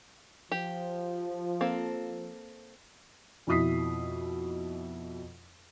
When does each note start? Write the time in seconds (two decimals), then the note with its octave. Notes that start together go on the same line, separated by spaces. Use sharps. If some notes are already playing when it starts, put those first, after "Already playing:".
0.52 F3 G4
1.61 A#3 C4 A4
3.47 F2 B2 E4 D#6 B6 C7